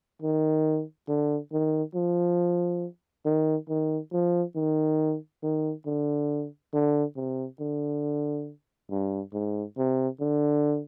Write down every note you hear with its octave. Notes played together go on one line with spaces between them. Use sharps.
D#3
D3
D#3
F3
D#3
D#3
F3
D#3
D#3
D3
D3
C3
D3
G2
G#2
C3
D3